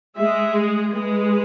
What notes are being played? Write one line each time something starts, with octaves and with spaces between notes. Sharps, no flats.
G#3 E5
G#4
G#3 B4